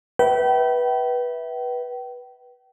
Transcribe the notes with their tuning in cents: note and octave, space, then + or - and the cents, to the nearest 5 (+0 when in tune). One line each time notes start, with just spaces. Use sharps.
B4 -15 E5 -5 G5 -35